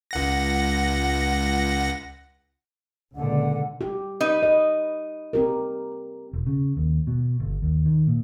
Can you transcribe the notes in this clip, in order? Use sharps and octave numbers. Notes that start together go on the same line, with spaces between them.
C#2 F#5 A#6
C#2 A#2 D3 F#5
G4
D#4 B4
D#5
C4 G4 A#4
E1
C#3
D#2
B2
G1
D#2
D#3
A#2